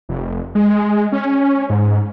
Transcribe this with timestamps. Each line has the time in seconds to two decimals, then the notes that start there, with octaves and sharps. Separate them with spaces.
0.09 F1
0.55 G#3
1.12 C#4
1.70 G#2